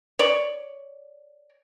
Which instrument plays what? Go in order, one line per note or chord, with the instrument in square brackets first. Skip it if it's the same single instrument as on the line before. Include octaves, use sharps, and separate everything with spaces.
[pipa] C#5 D5